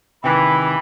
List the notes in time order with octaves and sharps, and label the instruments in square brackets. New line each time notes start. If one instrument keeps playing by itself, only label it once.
[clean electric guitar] C3 D#3 [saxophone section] E3 [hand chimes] G5 G#5 D6 [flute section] B5